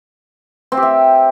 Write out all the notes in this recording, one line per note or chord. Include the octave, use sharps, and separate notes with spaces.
C4
G4
E5